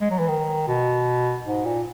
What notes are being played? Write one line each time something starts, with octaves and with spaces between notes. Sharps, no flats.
G#3
F#3
E3
D#3
B2
G#2
A#2